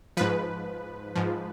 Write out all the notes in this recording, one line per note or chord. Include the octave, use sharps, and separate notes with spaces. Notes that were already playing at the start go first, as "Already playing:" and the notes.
G#2 F3 B4
G#2 F3